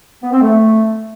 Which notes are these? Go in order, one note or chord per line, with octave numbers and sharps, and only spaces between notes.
B3
C4
A3